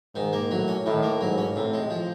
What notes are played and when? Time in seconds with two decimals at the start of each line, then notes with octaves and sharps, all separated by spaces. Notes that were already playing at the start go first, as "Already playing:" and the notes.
0.15 G#2 D#3
0.33 A#3
0.50 A2 F#3
0.68 C#4
0.85 A2 D#3
1.03 A#3
1.21 G#2 F#3
1.38 C#4
1.55 A2 C3
1.73 G#3
1.90 F3